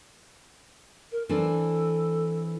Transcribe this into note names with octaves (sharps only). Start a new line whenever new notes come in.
A#4
E3 C4 D4 A4